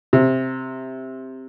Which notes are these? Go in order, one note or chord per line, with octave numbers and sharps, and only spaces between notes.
C3